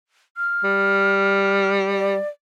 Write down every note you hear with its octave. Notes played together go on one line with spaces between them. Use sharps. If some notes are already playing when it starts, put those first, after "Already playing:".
F6
G3
D5